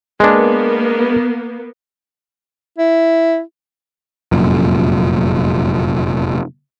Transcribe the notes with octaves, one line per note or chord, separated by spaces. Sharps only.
G#3 A#3 B3 D4
E4
F1 F#2 A#2